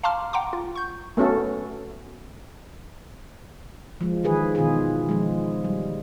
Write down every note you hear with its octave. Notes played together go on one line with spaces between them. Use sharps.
F5 A5 A#5 C6 D6 F6
F#5 G5 A#5 C6 D6
F4
C#6 G6
A3 B3 C#4 F#4 A4
F3 G#3
D#3 E3 G#4 B4
B2 D#3 E3 F4 G#4
F3 G#3
G3